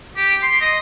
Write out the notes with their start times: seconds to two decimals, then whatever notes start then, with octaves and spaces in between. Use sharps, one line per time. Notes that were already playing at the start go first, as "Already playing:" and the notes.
0.16 G4
0.42 C6
0.61 D#5